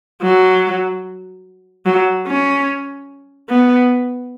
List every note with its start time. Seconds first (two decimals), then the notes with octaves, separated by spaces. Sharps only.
0.23 F#3
1.86 F#3
2.27 C#4
3.49 B3